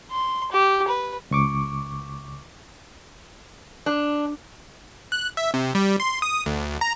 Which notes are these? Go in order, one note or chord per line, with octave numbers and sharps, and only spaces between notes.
C6
G4
B4
C#2 C#6 D6
D4
F#6
E5
C3
G3
C6
D#6
D2
A#5